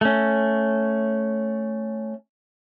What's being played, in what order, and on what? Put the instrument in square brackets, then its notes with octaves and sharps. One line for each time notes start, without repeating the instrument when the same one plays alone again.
[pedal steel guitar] A3 C#4